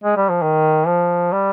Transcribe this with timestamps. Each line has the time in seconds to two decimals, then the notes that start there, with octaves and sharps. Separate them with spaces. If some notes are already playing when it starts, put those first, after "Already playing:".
0.04 G#3
0.17 G3
0.29 F3
0.42 D#3
0.87 F3
1.32 G3